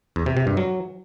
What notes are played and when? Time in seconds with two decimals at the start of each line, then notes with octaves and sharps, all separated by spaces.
0.16 E2
0.26 C3
0.37 C3
0.47 G2
0.57 F#3